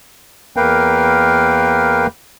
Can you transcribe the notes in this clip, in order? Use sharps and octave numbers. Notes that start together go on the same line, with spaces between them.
E2 A#3 A#4 B4 F5 G5